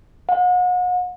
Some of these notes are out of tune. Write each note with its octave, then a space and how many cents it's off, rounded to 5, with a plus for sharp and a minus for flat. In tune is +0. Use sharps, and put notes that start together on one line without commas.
F#5 -40